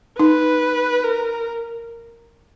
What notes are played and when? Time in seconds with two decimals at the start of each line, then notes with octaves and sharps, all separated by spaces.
0.19 D#4 B4
1.03 A#4